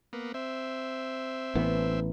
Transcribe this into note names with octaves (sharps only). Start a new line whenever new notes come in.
A#3 B3
C4 E5
A1 E3 B3